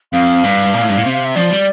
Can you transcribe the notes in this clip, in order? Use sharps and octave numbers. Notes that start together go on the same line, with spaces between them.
F2 F5
G2
A#2
A2
G2
A2
C3
F5
E5
F3 D5
G3